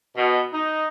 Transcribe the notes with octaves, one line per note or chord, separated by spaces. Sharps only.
B2
D#4